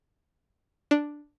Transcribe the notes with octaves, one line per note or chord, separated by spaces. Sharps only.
D4